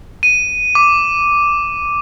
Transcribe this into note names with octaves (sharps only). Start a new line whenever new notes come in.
D#7
D6